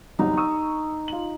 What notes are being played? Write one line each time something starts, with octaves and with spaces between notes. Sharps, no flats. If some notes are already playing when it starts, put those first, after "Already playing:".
G1 C2 F#3 D#4
C#6 D#6 E6
F4 F#7